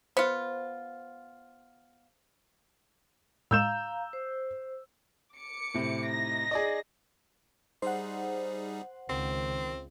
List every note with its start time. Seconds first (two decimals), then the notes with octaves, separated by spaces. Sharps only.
0.17 B3 F4 C5
3.51 A2 G#3 F5 A#5 E6 G6 E7
4.13 C5
5.36 D6 C#7
5.74 A2 C3
6.11 D#4 A#6
6.51 G#4 D5 D#5
7.82 G3 D#4 G#4 C5 F#5
9.10 C#2 D#3 C4